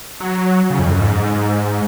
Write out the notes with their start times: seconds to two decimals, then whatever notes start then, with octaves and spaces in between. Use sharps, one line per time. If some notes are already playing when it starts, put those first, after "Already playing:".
0.20 F#3
0.70 C#3
0.79 F2
0.89 F#2
0.99 G#2